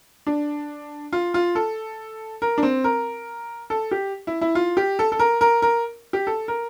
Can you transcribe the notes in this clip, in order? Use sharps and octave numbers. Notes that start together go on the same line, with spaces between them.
D4
F4
F4
A4
A#4
D4
C4
A#4
A4
G4
E4
E4
F4
G4
A4
A4
A#4
A#4
A#4
G4
A4
A#4